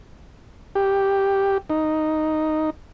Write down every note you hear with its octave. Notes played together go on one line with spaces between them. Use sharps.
G4
D#4